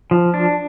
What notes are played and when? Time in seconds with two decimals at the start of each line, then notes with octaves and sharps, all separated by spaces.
0.11 F3
0.34 D4